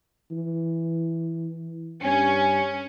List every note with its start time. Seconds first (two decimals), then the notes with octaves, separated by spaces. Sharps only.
0.31 E3
2.03 G2 C#4 G#5